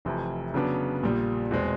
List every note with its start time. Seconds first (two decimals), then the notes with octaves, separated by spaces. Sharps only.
0.05 F1 F2 C3 E3
0.54 C#3 F#3 B3 D4
1.03 A#1 A#2 G3
1.51 E2 B2 G#3 C4